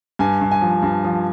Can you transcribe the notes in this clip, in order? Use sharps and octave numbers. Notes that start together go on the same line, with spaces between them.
G2 G#5
G2
G#5
F3
G2
F3